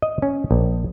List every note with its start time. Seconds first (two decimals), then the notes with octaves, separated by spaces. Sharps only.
0.02 D#5
0.22 C#4
0.51 A#1